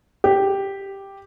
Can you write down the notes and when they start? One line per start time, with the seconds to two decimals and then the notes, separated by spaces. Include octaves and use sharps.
0.24 G4